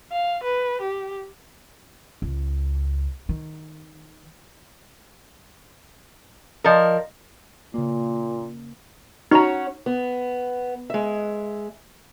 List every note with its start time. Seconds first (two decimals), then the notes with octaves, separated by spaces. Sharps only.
0.12 F5
0.43 B4
0.81 G4
2.22 C#2
3.29 D#3
6.64 F3 A#4 D5 D#5
7.74 A#2 C#3 A#3
9.31 C#4 D#4 F#4 C#5 A#5
9.86 B3
10.90 G#3 E5